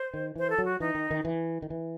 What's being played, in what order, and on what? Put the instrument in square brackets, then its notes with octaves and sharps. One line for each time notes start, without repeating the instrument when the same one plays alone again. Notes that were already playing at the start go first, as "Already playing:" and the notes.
Already playing: [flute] C5
[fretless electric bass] D#3
[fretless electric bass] E3 [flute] C5
[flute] A4
[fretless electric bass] F#3
[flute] F#4
[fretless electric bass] E3 [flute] D#4
[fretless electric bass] D#3
D#3
E3
D#3
E3